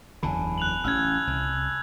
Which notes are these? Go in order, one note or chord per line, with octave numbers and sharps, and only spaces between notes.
F#1 E2 D3 G#5 A5 B5
F#6 F7 F#7
A1 C#4 E6 F6 G#6
C2